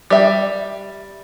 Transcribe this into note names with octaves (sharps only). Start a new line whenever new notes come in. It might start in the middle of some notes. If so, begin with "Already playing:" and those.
G3 E5